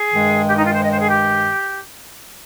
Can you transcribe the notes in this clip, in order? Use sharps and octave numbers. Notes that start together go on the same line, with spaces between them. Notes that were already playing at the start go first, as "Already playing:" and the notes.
Already playing: G#4
G2 D#3 G#3
G4
D#4
F4
C5
D#5
C5
G#4
G4